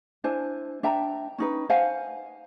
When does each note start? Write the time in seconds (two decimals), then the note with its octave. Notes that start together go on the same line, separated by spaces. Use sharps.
0.24 D4 E4 C5 G#5
0.83 D4 E5 G5 A#5
1.38 C#4 D#4 B4
1.69 C5 F5 F#5 G#5